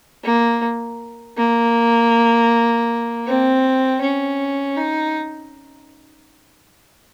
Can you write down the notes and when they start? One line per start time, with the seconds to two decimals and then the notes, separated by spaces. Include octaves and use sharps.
0.24 A#3
1.37 A#3
3.27 C4
4.02 C#4
4.77 D#4